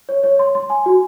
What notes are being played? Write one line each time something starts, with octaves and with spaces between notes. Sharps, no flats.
C#5
C#5
C6
C6
G#5
F#4